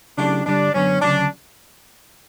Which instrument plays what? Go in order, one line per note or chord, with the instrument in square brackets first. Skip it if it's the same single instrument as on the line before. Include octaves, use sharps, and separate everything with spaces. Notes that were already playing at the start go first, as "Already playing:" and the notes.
[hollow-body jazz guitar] C#3 F#3 A3 E4 G4 [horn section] D4
[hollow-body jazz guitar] G2 D3 G3 [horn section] D4
[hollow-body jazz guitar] F#2 D3 F#3 B3 [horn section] C#4
[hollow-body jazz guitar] D2 C#3 F#3 C#4 [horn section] D4